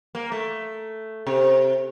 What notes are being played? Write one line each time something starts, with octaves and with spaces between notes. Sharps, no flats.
A#3
A3
C3